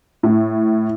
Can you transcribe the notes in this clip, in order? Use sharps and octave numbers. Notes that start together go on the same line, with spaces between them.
A2